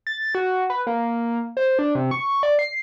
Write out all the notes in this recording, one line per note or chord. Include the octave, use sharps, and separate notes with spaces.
A6
F#4
B4
A#3
C5
D4
C3
C#6
D5
C7